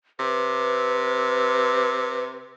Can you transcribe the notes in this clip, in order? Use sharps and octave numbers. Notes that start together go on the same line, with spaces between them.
C3 B4